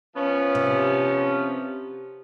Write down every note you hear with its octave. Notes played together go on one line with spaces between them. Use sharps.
F3 B3 C#4
C3